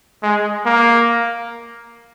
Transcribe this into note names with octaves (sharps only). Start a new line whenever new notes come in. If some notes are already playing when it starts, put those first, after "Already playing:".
G#3
A#3